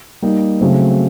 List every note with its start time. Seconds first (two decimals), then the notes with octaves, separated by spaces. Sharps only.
0.22 G3 A#3 D#4
0.60 C#3 F#3 A3 C4